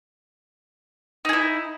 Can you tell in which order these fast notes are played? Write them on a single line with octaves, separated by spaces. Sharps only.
D#4 G#4 E4